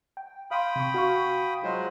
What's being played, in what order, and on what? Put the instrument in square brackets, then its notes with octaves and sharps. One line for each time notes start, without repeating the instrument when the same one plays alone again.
[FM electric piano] G5
[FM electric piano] F5 C6 [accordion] G5 B5 D#6
[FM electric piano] C3 C#6
F#4 F5 C#6
[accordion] F#3 G#3 C5 [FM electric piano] F4